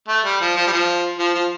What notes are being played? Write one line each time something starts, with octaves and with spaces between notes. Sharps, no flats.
A3
G3
F3
F3
G3
F3
F3
F3